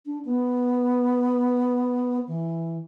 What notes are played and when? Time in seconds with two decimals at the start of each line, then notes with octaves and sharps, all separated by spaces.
0.06 D4
0.25 B3
2.27 E3